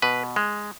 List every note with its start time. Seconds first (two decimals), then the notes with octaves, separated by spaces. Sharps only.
0.02 B2 B4
0.36 G#3